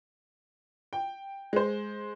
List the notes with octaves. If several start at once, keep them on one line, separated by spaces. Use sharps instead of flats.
G5
G#3 C5